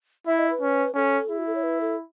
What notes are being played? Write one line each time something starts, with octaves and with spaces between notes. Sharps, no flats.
E4 E5
D#5
B4
C#4
C#4 A4
E4 G#4
F#4
A4
C#5
B4
A4